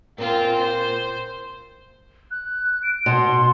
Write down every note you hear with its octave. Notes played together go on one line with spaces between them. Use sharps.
A#2 C4 F4
C5
F#6
D7
B2 C6